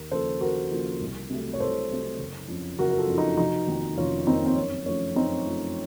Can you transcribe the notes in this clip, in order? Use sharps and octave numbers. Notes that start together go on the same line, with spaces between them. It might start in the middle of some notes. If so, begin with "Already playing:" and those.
Already playing: D#2
C#3 F3 A#3 A4 C5
D#2 F#4 A#4
C#3 F3 A#3
C2
C3 F#3 A3
C#5
C2 A4 C5
C3 F#3 A3
F#1
F2 C#3 F3
F#1 F#4 A#4
A#4
F4 A4
F2 C#3 F3
D#4 F#4
F1 D#4 F#4
F2 D#3 A#3
F1 C#4 F4
F2 D#3 A#3 C4 D#4
C4
F#2 C#4
F3 A3 C#4
F#2 C4 D#4
F3 A3